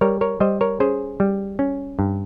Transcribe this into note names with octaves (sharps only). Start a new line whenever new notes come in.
G3 A#4 C#5
A#4 C#5
G3 C5 D#5
A#4 C#5
C#4 G#4 C5
G3
C#4
G2